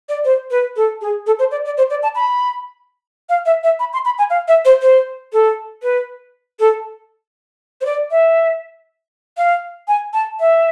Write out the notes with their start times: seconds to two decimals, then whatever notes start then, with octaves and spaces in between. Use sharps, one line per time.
0.09 D5
0.25 C5
0.51 B4
0.76 A4
1.01 G#4
1.27 A4
1.39 C5
1.51 D5
1.65 D5
1.77 C5
1.90 D5
2.03 A5
2.15 B5
3.29 F5
3.46 E5
3.63 E5
3.79 B5
3.93 C6
4.05 B5
4.18 G#5
4.30 F5
4.48 E5
4.65 C5
4.82 C5
5.33 A4
5.83 B4
6.59 A4
7.81 C5
7.85 D5
8.11 E5
9.38 F5
9.88 G#5
10.13 A5
10.40 E5